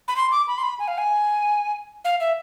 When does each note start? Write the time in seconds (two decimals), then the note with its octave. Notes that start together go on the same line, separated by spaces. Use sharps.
0.08 B5
0.16 C6
0.31 D6
0.47 B5
0.58 C6
0.63 B5
0.79 G#5
0.88 F5
0.98 G#5
2.05 F5
2.20 E5